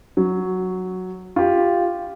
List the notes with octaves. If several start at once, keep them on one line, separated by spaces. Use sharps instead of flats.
F#3
F4 G4